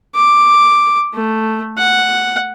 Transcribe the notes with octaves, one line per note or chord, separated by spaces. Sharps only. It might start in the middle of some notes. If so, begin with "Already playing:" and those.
D6
A3
F#5